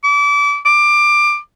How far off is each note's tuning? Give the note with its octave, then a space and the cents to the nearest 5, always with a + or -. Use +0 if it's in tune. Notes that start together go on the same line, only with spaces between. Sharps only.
D6 -30
D6 +20